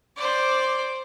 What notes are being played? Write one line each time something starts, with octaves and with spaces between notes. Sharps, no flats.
C5 D5